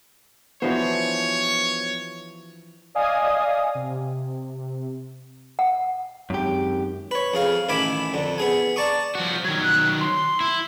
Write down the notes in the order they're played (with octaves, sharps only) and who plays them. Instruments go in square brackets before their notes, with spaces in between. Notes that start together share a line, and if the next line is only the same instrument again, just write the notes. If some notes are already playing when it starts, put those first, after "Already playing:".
[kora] E3 F3 C5 [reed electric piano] B3 D4 F#4 [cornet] C#5
[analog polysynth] D5 D#5 F5 G#5 D#6
C3
[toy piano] F#5
[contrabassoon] G#1 [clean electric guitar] F#2 G4
[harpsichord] B4 C#5
F2 G#4 F5
A1 D#3 E4 G#5 B5 D6
F2 D3
B3 G#4 G#5
D5 A5 A#5 C#6 D#6
[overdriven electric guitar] F3 F#4
[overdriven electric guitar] D#3 F#3 [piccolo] G#6
[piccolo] F#6
C6
[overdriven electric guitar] E4